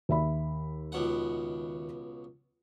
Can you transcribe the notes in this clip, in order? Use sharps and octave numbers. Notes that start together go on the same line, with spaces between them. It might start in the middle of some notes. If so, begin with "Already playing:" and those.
D#2 E5 B5
C#2 B2 F#5